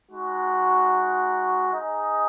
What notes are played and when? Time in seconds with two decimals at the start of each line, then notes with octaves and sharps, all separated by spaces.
0.10 G#3 D#4 F#4
1.70 D#4 G#4 D#5